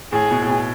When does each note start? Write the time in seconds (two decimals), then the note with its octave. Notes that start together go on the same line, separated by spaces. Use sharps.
0.12 A2 G#4
0.31 B2
0.42 A2
0.49 B2